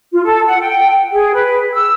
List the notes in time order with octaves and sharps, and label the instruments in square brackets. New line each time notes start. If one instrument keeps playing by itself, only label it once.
[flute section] F4
A4
F#5
G5
G#4
B4
E6